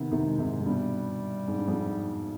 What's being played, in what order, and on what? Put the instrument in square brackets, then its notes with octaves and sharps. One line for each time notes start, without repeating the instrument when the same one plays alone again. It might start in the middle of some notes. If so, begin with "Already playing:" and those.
Already playing: [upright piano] C3 D#3 [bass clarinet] B3
[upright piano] C3 D#3
[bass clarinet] G#3
[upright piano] G#2 C3
G#2
[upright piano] G2 B2 [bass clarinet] G3
[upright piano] G#2
G2
F2 G#2